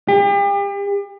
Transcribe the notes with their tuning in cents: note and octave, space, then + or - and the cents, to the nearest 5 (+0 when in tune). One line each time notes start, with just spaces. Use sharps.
G4 +40